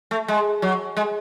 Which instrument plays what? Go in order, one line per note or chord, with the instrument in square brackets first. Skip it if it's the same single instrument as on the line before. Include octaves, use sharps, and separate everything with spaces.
[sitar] A3
G#3
F#3
G#3